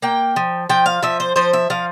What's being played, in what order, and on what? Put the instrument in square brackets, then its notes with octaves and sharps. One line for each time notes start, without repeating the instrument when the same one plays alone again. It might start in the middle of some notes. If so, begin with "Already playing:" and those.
[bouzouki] A#3 G5
F3
F3 G5
F5
F3 E5
C5
F3 C5
E5
F3 F5